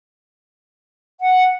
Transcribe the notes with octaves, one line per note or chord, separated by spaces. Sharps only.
F#5